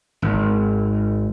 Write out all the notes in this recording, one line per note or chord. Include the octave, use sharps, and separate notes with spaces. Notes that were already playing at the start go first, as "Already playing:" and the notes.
G#1